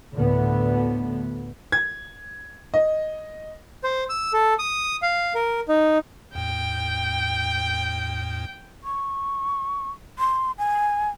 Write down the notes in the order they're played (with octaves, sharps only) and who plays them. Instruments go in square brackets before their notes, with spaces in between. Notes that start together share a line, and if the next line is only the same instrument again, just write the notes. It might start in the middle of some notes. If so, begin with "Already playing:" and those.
[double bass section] D2 A2 D3 B3
[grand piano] G#6
D#5
[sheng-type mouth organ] C5
E6
A4
D#6
F5
A#4
D#4
[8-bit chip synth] E2 A2 [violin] G5
[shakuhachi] C#6
C6
G#5